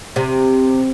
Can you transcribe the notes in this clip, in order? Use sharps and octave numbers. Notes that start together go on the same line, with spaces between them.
C3